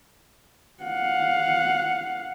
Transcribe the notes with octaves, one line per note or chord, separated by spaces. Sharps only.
F5 F#5